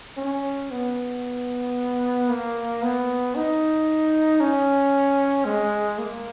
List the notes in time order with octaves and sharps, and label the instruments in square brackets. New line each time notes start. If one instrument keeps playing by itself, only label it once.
[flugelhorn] C#4
B3
A#3
B3
D#4
C#4
G#3
A#3